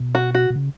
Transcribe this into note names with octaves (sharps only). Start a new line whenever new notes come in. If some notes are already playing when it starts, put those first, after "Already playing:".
Already playing: B2
F#4
F#4
B2
C#3